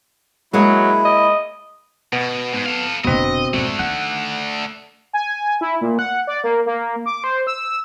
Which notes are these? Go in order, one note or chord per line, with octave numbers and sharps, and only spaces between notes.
F#3 G#3 A#3 E4 G#4
D#5
B2 B3
G#2
A4 F5
F1 B2 D3 C4 D#5
F2 G#2 D3 A3
D#3 F#5
G#5
E4
A#2
F#5
D5
A#3
A#3
D6
C5
E6